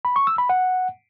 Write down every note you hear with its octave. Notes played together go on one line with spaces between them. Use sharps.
B5
C#6
E6
B5
F#5